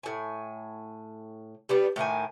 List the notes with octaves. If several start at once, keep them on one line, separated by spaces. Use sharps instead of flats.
A2 G#5
G3 B3 D4
A2 D#3 A#3 G#5